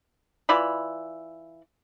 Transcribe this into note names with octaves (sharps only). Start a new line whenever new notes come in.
E3 F4 D5 B5